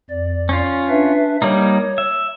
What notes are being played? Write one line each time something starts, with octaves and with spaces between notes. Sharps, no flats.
F2 D5
C#4 F4
D4 B4 E5
G3 A#3 D#4 C#5
E5